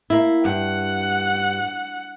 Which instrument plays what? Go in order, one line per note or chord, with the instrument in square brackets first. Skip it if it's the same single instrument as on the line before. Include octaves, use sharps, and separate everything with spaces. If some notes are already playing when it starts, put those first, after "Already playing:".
[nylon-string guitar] A#3 E4
[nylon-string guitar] G2 [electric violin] F#5